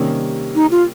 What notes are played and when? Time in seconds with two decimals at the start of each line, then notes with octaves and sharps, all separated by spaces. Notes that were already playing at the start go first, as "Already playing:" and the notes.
Already playing: C3 D#3 G3 A#3 C#4
0.55 D#4
0.71 F4